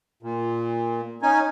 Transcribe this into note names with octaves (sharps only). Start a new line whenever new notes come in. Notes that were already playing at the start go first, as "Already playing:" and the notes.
A#2
C#4 D#4 G#5